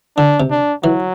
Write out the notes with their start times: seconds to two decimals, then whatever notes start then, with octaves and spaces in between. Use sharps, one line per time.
0.17 D3 D4
0.40 C3
0.51 D4
0.84 E3 F#3